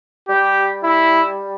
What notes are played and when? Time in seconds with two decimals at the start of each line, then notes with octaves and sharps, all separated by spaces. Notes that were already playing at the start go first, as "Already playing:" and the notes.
0.29 G3 G4
0.83 E4